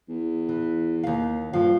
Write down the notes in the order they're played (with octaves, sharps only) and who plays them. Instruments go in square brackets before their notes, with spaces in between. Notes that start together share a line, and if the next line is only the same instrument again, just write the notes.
[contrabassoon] E2
[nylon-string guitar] E3
D#2 F5
[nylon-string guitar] G2 F5 [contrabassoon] F3